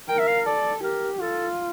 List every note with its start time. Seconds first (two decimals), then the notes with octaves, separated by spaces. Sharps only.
0.09 A#4 G5
0.19 E5
0.27 F5
0.46 A4 D5
0.83 G4 A#4
1.21 F4 A4